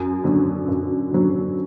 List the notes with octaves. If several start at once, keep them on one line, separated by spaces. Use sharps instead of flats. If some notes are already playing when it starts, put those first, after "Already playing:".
Already playing: F#2
D3 F#3
F#2
D3 F#3